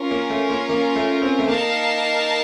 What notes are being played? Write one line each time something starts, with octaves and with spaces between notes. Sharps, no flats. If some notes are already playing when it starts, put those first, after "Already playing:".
Already playing: C#4 F4 A#4
A#3
A3
A#3
A#3
A3
C4
A3
A#3 D#4 A#4 F5 A5